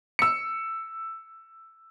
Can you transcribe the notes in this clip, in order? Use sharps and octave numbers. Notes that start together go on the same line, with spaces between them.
E6 C#7